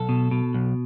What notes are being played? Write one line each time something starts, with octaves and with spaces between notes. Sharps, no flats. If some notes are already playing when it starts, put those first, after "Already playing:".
Already playing: B1 A4
B2
B2
B1